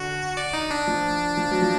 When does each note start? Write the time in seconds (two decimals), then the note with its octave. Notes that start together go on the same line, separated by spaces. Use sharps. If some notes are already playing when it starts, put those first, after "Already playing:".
Already playing: D3 F#4
0.37 D5
0.54 D#4
0.71 D4
0.87 F3
1.37 F3
1.51 F#3
1.62 F3